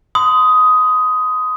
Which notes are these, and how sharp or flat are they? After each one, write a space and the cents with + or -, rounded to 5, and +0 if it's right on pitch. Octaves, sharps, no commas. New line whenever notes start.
C6 -40 D#6 +10